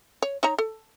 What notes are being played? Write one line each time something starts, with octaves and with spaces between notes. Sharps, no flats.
C#5
D#4 C#5 A#5
A4